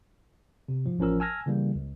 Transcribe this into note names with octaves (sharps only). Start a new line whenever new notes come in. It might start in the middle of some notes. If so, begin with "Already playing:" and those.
C3
G#2 F3
A1 F3 C#4 A#4 E6
G#5 A5 E6 F6 G#6 A#6
C#3 E3 G3 A#3
C#2